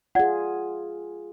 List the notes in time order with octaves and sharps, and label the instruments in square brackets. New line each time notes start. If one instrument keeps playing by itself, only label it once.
[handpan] F4 G#4 [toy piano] D5 F#5